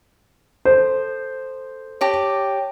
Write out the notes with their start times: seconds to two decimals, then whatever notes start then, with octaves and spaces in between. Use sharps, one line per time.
0.65 A4 C5
2.01 G4 C#5 D5 A5 A#6